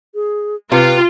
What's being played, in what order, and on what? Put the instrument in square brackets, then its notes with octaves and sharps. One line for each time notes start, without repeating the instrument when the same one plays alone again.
[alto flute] G#4
[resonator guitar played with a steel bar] C3 G4 [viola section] F4 [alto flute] B4